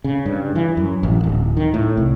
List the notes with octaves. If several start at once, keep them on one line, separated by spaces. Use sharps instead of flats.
C#3
G2
E3
F#2
A1
D1
D#3
A2
C2